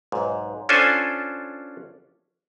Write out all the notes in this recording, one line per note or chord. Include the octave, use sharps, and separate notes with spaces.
B1 G#2
C#4 D4 F4 A4 C5 G#5